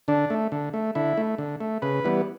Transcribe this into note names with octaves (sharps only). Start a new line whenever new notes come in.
D3 D4
A3
D3
A3
D3 E4
A3
D3
A3
C#3 B4
E3 G3 B3